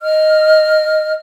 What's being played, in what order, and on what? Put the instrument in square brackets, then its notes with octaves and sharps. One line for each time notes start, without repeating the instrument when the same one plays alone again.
[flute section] D#5 F6